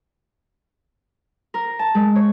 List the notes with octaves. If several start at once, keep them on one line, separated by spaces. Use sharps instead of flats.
A#4
A5
G#3
C#5